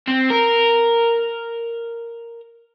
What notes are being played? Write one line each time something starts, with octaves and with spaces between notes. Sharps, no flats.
C4
A#4